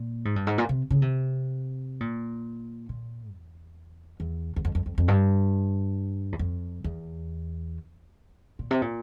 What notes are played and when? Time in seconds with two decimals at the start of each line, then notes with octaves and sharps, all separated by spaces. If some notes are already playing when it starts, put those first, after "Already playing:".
Already playing: A#2
0.25 G#2
0.36 G2
0.47 G#2
0.58 A#2
0.69 C3
0.90 C#3
1.02 C3
2.00 A#2
2.89 A#2
3.33 E2
4.20 E2
4.56 E2
4.65 F2
4.75 F2
4.86 F2
4.98 F2
5.08 G2
6.32 E2
6.39 F2
6.84 E2
8.59 A#2
8.71 C3
8.82 A#2